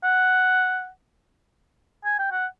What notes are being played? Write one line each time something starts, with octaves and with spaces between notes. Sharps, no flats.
F#5
G#5
G5
F#5